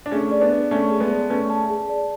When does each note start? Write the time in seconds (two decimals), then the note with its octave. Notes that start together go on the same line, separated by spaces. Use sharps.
0.06 D4
0.11 A3 C#4 G#4
0.32 D5
0.41 B3 D4
0.51 B4
0.71 A3 C#4 A5
0.91 G#4
1.00 G#3 B3
1.11 D5
1.30 A3 C#4 B4
1.50 A5
1.70 G#4
1.89 D5